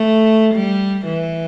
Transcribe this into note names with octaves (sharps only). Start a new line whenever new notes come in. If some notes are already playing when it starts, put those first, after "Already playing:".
Already playing: A3
G3
E3